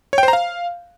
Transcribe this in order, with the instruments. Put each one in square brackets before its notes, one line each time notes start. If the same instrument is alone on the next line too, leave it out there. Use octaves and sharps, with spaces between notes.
[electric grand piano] C#5
G5
C5
A#5
F5